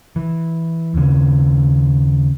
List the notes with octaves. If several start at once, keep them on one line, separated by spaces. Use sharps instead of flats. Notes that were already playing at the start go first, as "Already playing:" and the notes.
E3
D#2 C#3